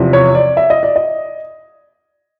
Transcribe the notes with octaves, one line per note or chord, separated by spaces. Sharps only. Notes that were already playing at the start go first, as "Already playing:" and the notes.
Already playing: E2 C3 F3
C#5
D5
E5
D#5
D5
D#5